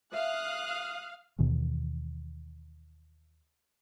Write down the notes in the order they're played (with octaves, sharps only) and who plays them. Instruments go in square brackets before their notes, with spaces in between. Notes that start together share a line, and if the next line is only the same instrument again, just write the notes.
[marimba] E5 [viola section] F5 [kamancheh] D#6 F#6
[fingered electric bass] D#2 B2 D#3 E3